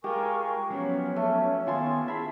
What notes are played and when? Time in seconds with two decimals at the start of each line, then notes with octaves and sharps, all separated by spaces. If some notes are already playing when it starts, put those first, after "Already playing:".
0.04 G#3 F4 G4 A#4 G#5 C#6
0.70 F3 F#3 B3 C#4
1.16 A3
1.67 D#3 B3 F4 G#5 A5 C6
2.08 E4 G#4 E5 B5